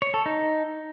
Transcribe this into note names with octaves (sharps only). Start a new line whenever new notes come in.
C#5
A4
D#4